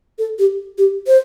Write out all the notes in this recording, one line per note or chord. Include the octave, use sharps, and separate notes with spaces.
A4
G4
G4
C5